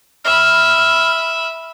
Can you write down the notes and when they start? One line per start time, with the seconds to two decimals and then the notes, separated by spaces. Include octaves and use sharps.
0.25 E5 B5 F6